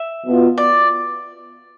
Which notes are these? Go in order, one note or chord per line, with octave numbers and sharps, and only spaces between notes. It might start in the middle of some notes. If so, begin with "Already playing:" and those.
Already playing: E5
B2 B3 F4
D5